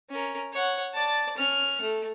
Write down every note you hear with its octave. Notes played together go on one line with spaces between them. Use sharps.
C#4 A#4
C#5 F#5
D5 A5
C#4 F6
A3